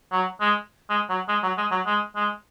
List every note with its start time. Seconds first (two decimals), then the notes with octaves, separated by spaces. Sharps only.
0.12 F#3
0.41 G#3
0.90 G#3
1.10 F#3
1.28 G#3
1.43 F#3
1.57 G#3
1.71 F#3
1.86 G#3
2.16 G#3